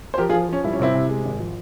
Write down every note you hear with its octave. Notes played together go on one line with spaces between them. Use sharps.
C5
F3 G4 A#4
F4 G#4
F3
F3 C#4
G3 E4
C#4
C3 C4 E4
C3
G#3
G#1
F3